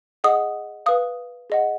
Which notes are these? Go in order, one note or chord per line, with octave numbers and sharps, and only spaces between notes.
G#4 D#5 F#5 D#6
B4 F5 D#6
G#4 D#5 F#5